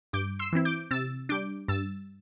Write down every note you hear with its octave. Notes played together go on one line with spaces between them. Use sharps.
G2 D6 G6
C6 E6
E3 C4 E4
D6 G6
C3 E6 A6
G3 D4 D6 G6
G2 E6 A6